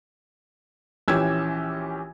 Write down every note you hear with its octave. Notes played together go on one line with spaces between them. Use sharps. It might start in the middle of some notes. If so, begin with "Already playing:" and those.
A#1 E3 C#4 G4 E6 G#6